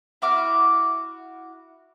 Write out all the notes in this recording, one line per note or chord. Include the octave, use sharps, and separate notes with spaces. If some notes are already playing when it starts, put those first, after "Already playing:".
E4 F#4 D6 F6